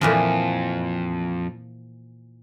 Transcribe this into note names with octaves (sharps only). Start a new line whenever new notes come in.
F2 A#2 E3 F3